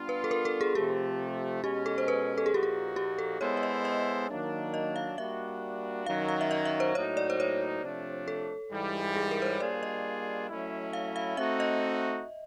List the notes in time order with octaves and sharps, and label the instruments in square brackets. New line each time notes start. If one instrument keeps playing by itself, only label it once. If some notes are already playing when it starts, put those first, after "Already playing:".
Already playing: [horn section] G3 B3 D4 F4
[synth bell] B4
A4
A#4
A4
G#4
[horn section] C3 F3 A3 [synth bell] G4
[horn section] B2 G#3 C#4 [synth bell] G4
[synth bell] A4
C5
B4
A4
G#4
[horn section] A#2 F3 A#3 D#4 F#4 [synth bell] G4
[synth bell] G#4
G4
A4
[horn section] G#3 B3 E4 A4 C5 [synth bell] C#5
[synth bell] E5
D#5
D#5
[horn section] D#3 F#3 A#3 D4
[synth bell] D#5
F5
[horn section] G3 A#3 D4 F#4 [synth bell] E5
[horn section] F#2 D#3 F#3 [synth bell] F5
[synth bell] F5
E5
D#5
E5
C5
[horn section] A2 F#3 A#3 D#4 F#4 [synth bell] C#5
[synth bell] D5
C5
C#5
[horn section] C3 F3 A3 D4
[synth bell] A4
[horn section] G#2 E3 G3
[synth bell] G#4
A#4
C5
C#5
[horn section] G3 A#3 D4 F4 G#4 [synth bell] D5
[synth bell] D#5
[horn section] F#3 A3 C#4 E4
[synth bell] F5
F5
[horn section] A3 C4 D#4 F#4 [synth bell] E5
[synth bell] D#5